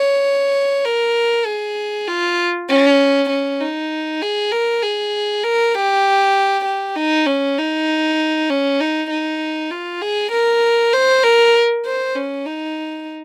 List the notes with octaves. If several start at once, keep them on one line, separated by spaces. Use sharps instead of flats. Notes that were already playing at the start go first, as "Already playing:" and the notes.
Already playing: C#5
A#4
G#4
F4
C#4
C#4
D#4
G#4
A#4
G#4
A#4
G4
G4
D#4
C#4
D#4
C#4
D#4
D#4
F4
G#4
A#4
C5
A#4
C5
C#4
D#4